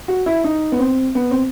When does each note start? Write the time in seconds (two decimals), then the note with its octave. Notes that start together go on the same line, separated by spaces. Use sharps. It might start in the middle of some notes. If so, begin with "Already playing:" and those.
0.08 F#4
0.26 E4
0.44 D#4
0.72 B3
0.79 C4
1.15 B3
1.31 C4